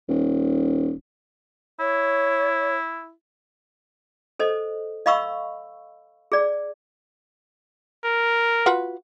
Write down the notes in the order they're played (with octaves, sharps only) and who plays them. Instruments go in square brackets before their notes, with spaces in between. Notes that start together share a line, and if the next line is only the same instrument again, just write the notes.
[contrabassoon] D#1
[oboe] E4 [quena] C#5
[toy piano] A4 C5 D#5
D#5 F5 B5 C#6 E6
G#4 D5
[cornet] A#4
[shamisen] F4 F#4 B4